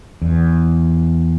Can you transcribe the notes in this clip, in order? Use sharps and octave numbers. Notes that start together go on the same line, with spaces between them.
E2